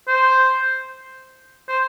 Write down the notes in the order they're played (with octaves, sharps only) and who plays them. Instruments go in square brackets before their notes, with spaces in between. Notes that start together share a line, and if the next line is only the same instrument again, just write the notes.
[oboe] C5
C5